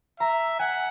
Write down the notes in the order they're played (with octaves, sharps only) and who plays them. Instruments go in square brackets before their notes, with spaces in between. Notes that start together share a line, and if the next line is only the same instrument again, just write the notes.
[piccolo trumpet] E5 [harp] A#5
[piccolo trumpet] F#5 [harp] G#5